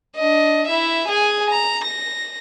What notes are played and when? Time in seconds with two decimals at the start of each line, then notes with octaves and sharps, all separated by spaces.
0.16 D4 D#5
0.67 E4 E5
1.08 G#4 G#5
1.50 A#5
1.84 A#6